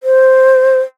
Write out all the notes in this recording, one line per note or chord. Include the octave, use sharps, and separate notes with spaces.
C5